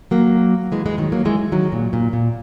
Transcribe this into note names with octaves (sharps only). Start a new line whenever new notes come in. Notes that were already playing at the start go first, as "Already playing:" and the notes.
F#3 A#3
E3 G#3
E3 G#3
D#3 F#3
F#3 A#3
E3 G#3
D#3 F#3
A#2
A#2
A#2